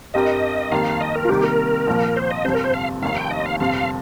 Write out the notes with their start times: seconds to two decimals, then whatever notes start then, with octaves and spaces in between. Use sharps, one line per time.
0.14 G2 G3 C4 G4 A#4 D#5
0.71 F2 D#3 A#3 G4 F5
1.01 D#5
1.15 A#4
1.25 F4
1.29 C3 D#3 G3 A#3 G4
1.43 A#4
1.87 A#1 A#2 F3
2.16 C5
2.30 D#5
2.45 G1 F2 C3 C5
2.54 A#4
2.64 C5
2.74 F5
3.02 F1 D#2 D#3 F5
3.16 G5
3.31 D#5
3.46 F5
3.60 G1 F2 C3 F5